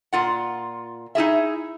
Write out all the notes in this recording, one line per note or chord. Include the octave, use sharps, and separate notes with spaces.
A#2 F4 F#5
D#4 E4 G#4 E5